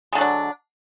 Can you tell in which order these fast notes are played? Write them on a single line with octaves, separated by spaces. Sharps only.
G#3 D3 F#3 D4